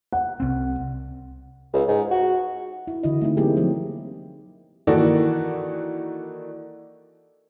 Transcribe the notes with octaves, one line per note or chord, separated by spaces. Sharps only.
F#5
C2 C4
C#2
G#2
F#4
E4
D3 E3 E4 F#4 D#5
A3 C4 D#4
F#3 A#3 C4 E4 G4 G#4
F3 F#3 C4
D#3 E3 A#3 F#4 A4 D5